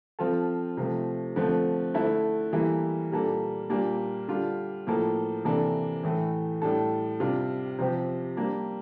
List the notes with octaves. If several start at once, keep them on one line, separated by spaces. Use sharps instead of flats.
F3 C4 F4 A4
C3 F3 A3
D3 F3 A3 C4
D3 A3 E4 A4
E3 G3 A#3 E4 A4
A#2 G3 A#3 D4 A4
A#2 G3 A#3 D4
D3 G3 D4 F4
A2 F3 A#3 F4 A4
C3 E3 A#3 D4 A4
A2 E3 A3
A2 G3 D4 A4
C3 G3 D4 F4
C3 F3 C4 G4
G3 A#3 D4